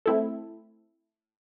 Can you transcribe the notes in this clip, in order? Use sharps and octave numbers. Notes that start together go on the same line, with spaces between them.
A3 C4 E4 A4